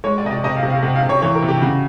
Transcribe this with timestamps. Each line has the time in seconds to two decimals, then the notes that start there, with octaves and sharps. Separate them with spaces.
0.04 G#3 C#5
0.18 D5
0.24 C3 D#5
0.31 D5
0.44 C3 D#5
0.57 F5
0.63 C3
0.70 F5
0.83 C3 F#5
0.96 F5
1.03 C3
1.09 C#5
1.22 E3 C#5
1.35 A#4
1.42 C3
1.48 G4
1.62 C#3 F#4